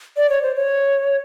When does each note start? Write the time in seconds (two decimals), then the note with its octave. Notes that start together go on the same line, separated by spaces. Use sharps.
0.17 D5
0.30 C#5
0.42 C5
0.55 C#5